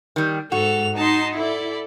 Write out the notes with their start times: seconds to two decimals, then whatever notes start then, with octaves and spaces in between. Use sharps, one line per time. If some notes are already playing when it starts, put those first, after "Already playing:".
0.16 D#3 G3
0.52 G#2 F#4 A4 F7
0.97 D#4 A5 C6
1.37 E4 A4 D5